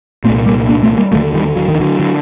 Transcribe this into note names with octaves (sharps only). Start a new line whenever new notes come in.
A#2 A3 C4
C2
G3 A#3
A#3 D4
A3 C4
G3 A#3
D#2 D3 F#3 A3
D#3 G3
F#3
D#3
D3 F#3
D3